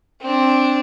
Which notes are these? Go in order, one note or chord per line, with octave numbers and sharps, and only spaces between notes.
C4 D4